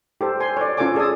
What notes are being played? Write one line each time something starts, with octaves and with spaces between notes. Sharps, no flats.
G4 A4 C5
C5 G#5 C6
C#5 D5
C#4 F4 A4 C#5 G#5 D6
G#4 A4 D5 G#5 D#6